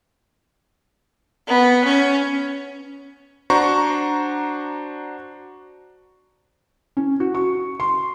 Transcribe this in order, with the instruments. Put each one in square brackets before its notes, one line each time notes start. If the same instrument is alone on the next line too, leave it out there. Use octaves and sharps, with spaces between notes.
[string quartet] B3
C#4
[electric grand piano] D4 F#4 C5 A#5 C#6
[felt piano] C#4
F#4
C#6
C6